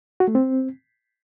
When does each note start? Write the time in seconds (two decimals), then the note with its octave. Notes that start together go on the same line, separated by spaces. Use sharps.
0.20 F#4
0.28 A3
0.35 C4